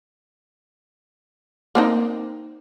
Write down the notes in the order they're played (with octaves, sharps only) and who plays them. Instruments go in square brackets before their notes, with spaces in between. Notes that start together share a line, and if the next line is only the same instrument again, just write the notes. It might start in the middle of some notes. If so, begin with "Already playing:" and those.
[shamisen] A#3 C4 D#4